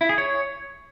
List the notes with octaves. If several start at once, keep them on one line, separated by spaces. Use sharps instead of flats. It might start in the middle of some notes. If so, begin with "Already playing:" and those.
E4
G#4
C#5